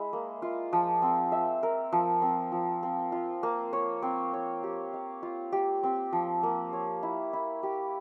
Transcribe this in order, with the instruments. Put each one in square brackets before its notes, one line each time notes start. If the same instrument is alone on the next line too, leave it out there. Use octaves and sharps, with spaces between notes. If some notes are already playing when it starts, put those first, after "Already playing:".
Already playing: [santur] G#3 E4
A#3
F4
F3
C4
E5
A#4
F3
C4
F3
C4
F4
A#3
C#5
C4
C#5
G4
F5
F4
G4
C4
F3
A#3
C#5
E4
E4
G4